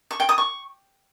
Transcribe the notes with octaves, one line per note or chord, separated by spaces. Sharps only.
C#6
G5
D#6
C#6